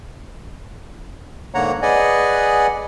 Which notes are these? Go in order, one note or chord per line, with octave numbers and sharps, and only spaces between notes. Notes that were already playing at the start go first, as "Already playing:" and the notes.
G#2 D3 A#3 C#5 F#5 A#5
G#4 B4 D5 D#5 F#5 G#5